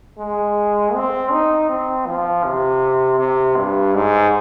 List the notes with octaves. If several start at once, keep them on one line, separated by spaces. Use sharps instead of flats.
G#3
C4
D#4
C4
F3
C3
C3
G2
G#2